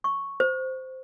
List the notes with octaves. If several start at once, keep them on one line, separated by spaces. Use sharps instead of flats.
C#6
C5